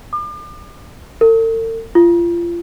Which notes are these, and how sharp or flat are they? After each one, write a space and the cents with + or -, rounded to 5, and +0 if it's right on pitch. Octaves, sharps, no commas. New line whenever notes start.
D6 +40
A4 +45
F4 -30